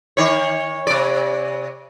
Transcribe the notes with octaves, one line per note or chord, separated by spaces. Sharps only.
D#3 C#5
C3 D5